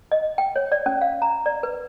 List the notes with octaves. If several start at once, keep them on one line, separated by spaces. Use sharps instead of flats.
D#5
G5
C#5
D5
C#4
F5
A#5
D5
B4